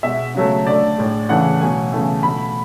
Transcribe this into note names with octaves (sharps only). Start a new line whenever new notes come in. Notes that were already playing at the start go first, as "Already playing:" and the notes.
B2 G#3 E5
C#3 F#3 A3
D3 A3 D5
A2 G#3
C#3 E3 A3 F#5
B2 F#3 A3 G#5
C#3 E3 A3
B2 A3 B5